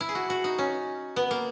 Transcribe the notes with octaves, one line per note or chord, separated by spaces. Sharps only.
E4
G#4
F#4
F#4
D#4
C#4
B3
A#3